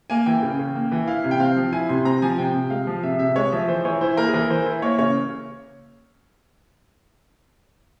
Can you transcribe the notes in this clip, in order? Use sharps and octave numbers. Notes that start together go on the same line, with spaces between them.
A#3 G#5
E3 G5
C#3
C#3
A#3
E3
E4 F5
C3
G5
C4 F5
F3
E4 G#5
C3 C6
C4 A#5
F3 G#5
C3 G5
C3
G#3 F5
F3
C3 E5
C3 E5
G#3 C#5
F3 E5
E3 C5
E3 C#5
E4 C5
A#3 A#4
G#4
E3 A#4
E3 C5
E4
A#3 C#5
C#3 C#5